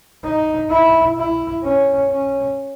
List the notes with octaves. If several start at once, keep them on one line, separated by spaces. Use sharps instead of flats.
D#4
E4
E4
C#4
C#4